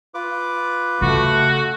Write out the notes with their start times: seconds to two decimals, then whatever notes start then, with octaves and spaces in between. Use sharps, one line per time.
0.14 F4 B4 D6
1.01 C#3 A3 F#4